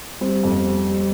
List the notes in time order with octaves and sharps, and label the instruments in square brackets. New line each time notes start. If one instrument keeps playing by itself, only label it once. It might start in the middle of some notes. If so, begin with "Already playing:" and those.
[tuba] G3 [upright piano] C4
[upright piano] F2